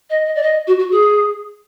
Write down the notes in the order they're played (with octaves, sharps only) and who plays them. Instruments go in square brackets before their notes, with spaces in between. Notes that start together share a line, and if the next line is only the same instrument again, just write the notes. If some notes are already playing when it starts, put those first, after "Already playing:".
[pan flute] D#5
D#5
D5
D#5
F#4
F#4
G#4